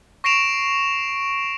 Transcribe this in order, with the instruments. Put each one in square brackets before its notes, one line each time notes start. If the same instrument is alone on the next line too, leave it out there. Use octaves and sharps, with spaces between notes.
[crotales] C#6 A#6 C7 D7 E7 F7